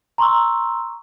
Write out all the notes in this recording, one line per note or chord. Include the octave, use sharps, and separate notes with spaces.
A#5 C6 C#6 E6